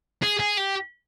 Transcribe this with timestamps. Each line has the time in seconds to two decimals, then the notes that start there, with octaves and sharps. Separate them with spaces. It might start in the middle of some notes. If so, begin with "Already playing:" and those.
0.22 G#4
0.40 G#4
0.58 G4